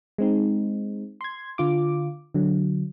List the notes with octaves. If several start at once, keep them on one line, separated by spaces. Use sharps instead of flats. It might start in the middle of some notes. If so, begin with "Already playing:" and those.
G#3 C4 D#4
C6 G#6
D3 F4 D6
D3 F#3